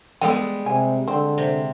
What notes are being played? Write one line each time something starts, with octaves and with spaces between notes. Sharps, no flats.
G3 G#3 B3 A4 G5
C3 G#5
D3 C4
C3